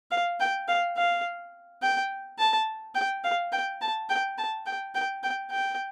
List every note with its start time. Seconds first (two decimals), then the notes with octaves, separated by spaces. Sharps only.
0.11 F5
0.40 G5
0.68 F5
0.98 F5
1.82 G5
2.39 A5
2.95 G5
3.24 F5
3.53 G5
3.81 A5
4.09 G5
4.38 A5
4.66 G5
4.95 G5
5.23 G5
5.51 G5